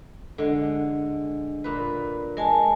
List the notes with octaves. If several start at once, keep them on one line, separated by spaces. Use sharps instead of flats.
D3 G#3
A#2 B4
G#3 A#4 G#5 A5